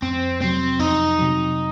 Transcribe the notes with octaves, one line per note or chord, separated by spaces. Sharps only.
F2 C4
C3 F#3 C4
F2 D#4
C3 F#3